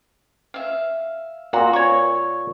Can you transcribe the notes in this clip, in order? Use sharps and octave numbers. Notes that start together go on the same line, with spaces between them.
E5 F5
A#2 F#4 A#5
C#5 C#6